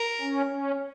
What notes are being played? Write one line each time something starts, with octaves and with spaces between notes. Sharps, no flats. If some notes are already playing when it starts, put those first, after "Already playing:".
Already playing: A#4
C#4
C#4